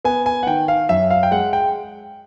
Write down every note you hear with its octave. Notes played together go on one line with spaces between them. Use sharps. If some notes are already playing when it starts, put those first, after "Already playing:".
B3 G#5
G#5
F#5
D#3 G5
F5
F#2 E5
F5
G5
G#3 F#5
G5